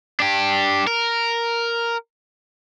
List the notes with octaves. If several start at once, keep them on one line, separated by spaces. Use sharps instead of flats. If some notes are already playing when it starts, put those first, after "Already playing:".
D4 G4
A#4